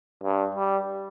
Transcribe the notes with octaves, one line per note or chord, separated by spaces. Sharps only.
G2
G3